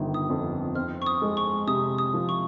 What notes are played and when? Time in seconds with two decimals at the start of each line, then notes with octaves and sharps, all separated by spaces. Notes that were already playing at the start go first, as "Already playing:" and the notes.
Already playing: G1 D#3
0.14 D#6
0.30 F2
0.75 C4 F6
1.02 C#6
1.06 D#6
1.22 G#3
1.37 C#6
1.67 C3 D#6
1.98 D#6
2.14 F3
2.29 C#6